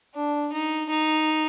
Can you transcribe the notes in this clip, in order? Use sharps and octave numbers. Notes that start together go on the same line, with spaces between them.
D4
D#4
D#4